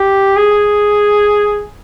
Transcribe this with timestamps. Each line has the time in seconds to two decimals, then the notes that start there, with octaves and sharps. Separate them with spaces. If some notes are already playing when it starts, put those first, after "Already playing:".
Already playing: G4
0.36 G#4